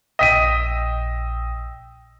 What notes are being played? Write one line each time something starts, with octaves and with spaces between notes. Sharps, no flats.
A#1 D#5 G5 E6 B6 D#7